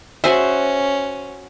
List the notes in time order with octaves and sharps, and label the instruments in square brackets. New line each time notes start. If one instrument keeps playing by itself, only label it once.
[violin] C#4 [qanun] F#4 C5 [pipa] G#4 E5